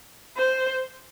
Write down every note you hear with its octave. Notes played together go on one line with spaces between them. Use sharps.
C5